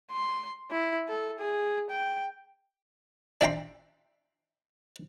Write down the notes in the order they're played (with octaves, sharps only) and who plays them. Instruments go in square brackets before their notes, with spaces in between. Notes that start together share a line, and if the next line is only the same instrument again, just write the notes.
[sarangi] C6
E4
A4
G#4
G5
[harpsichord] D4 D5 E5 G5 A#5 C6